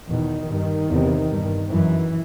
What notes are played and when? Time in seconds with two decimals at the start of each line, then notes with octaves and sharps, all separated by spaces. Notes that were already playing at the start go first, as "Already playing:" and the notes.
0.09 E2 B2 D#3
0.49 G2 D#3
0.90 E2 C3
1.31 G2
1.71 F#2 E3